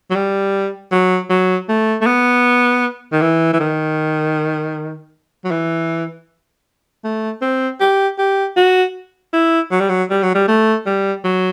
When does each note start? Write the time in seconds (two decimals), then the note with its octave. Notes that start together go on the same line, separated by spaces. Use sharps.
0.10 F#3
0.15 G3
0.91 F#3
1.30 F#3
1.68 A3
2.01 A3
2.06 B3
3.12 D#3
3.21 E3
3.53 E3
3.60 D#3
5.45 F#3
5.51 E3
7.04 A3
7.41 C4
7.80 G4
8.18 G4
8.56 F#4
9.33 E4
9.71 F#3
9.80 G3
9.89 F#3
10.10 G3
10.23 F#3
10.34 G3
10.48 A3
10.86 G3
11.24 F#3